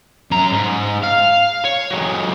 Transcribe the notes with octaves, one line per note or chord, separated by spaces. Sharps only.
F#2 A#5
G#2
F5
C#5
F#3 G#3